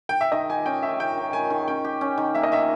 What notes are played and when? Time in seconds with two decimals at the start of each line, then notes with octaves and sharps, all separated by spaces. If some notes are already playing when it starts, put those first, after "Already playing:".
0.09 G5
0.21 E5
0.32 D#3 D#5
0.50 G4 G#5
0.66 C#4 G5
0.82 D#3 E5
1.00 C#4 G5
1.17 D#3
1.33 D#3 G#5
1.50 D#3
1.68 C#4 G5
1.84 G4
2.01 C#4
2.18 D#3
2.34 A#3 E5
2.43 D#5
2.52 D#3 E5